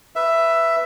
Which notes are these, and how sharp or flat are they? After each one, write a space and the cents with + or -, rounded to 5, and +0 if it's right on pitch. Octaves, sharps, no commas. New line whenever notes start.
B4 +0 E5 +10